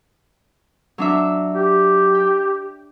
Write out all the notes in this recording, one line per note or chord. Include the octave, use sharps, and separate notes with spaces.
F#3 D4 E5
G4
G5